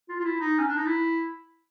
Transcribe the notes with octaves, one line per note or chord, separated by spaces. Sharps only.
F4
F4
E4
D#4
C#4
D4
D#4
E4